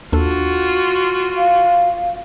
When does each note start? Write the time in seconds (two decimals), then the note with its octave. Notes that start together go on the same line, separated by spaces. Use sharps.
0.12 D#2 D4 F4 F#4 A4
1.37 F5